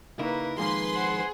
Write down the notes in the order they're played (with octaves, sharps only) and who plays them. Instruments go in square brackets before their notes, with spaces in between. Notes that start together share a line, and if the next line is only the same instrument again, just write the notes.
[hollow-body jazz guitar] C#3 D#4 E4 [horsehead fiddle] A#3 B4 [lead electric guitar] A#4
[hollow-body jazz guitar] F2 G#2 D#3 [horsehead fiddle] A#3 [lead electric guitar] G#4 [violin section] B4 C6
[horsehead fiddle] C5 F#5